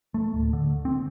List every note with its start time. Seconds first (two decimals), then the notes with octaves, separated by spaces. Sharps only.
0.14 A3
0.34 D1
0.53 D3
0.85 C4